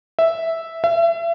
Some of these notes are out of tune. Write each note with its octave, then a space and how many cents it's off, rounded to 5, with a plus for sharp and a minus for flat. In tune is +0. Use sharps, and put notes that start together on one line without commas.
E5 -5
E5 +35